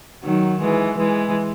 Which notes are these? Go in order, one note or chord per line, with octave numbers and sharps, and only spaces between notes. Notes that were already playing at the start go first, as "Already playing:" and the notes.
D#3 F#3
E3 G#3
E3 G#3